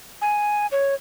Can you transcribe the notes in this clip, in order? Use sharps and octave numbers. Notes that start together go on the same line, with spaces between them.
G#5
C#5